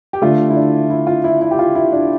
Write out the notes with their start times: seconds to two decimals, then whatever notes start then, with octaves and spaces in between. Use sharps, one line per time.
0.13 G4
0.22 D3 A3 F4
0.50 E4
0.56 D4
0.90 E4
1.07 F4
1.24 E4
1.41 E4
1.51 G4
1.59 F4
1.75 E4
1.92 D4